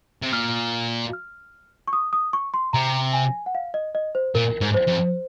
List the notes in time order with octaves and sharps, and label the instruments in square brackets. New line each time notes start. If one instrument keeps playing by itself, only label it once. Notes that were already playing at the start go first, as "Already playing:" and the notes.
[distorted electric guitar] C3
[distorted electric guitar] A#2 [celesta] F6
[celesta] F6
C#6
D#6
D#6
C#6
C6
[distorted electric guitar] C3 [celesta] A#5
[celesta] G#5
F#5
F5
D#5
D#5
C5
[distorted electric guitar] A#2 [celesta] A#4
[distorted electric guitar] G#2
[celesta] C5
[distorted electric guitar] F2